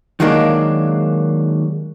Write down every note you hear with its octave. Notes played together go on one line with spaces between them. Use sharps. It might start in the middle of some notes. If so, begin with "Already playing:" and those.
D#3 F#3 G#3 A#3 D4